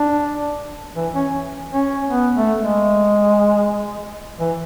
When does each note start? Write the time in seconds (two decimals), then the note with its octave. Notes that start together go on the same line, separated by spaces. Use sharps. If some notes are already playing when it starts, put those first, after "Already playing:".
Already playing: D4
0.95 E3
1.14 C#4
1.72 C#4
2.10 B3
2.35 A3
2.61 G#3
4.39 E3